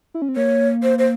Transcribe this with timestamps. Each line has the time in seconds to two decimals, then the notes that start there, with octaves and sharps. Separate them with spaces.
0.14 E4
0.22 C#4
0.29 C4
0.36 A#3 C#5
0.83 C5
0.99 C5